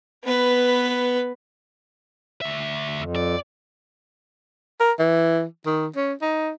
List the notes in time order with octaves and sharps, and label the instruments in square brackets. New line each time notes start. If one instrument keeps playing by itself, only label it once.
[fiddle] B3 B4
[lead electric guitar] D2 E5
[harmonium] F2
[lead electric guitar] D5
[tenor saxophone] A#4
E3
D#3
C#4
D#4